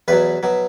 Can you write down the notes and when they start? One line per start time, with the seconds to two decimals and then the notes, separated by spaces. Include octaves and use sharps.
0.08 E2 B2 F#3 B4
0.43 B2 F#3